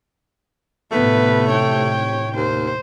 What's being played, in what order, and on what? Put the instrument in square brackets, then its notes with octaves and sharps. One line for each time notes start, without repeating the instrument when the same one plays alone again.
[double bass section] A2 C3 [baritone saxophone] A3 [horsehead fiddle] B3 B4
[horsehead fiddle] C#5 G5
[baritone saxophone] D#2 [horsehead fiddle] C5